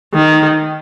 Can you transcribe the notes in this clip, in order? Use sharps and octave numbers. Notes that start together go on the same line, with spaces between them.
D#3